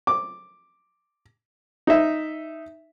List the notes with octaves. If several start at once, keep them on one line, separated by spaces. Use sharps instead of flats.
D6
D#4 E5